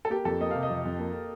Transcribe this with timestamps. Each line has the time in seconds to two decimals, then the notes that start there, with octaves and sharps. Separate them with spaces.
0.05 A4
0.10 A#3 G4
0.25 F2 A4
0.41 A#3 D#5
0.51 C3 F5
0.63 D#5
0.70 F2
0.85 F2
1.00 A#3